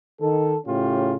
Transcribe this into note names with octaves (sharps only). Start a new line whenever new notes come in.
D#3 A4
A2 C#3 C#4 F4 G4